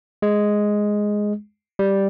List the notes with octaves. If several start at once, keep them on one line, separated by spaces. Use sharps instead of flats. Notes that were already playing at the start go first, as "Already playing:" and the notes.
G#3
G3